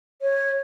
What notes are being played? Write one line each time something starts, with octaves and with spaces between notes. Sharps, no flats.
C#5